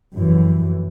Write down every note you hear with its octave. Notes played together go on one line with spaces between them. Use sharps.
F1 F#2 E3